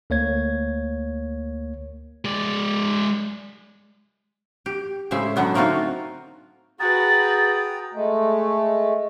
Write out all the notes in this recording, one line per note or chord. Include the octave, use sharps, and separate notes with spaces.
D2 A#3 C#5 G#6
G#3 D5
G4
A2 C#3 G#3 C5 E5
D3 F#3 B3 C#4
A3 A#3 C4 D#4 F4 F#4
F#4 G#4 B4 G5 A#5 D#6 A6
G#3 A3